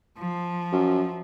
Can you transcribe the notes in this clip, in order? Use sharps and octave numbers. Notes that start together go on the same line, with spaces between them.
F3
F#2